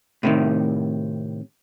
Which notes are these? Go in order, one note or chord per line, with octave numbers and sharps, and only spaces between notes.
A2 C3 D#3